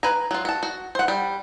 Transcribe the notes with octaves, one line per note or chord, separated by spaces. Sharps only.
B4 G#5 A#5
F#3 F4
F#4 A5
F#4
C5 F#5
G3